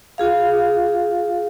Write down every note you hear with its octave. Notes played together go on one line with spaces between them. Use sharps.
F4 G#4 F5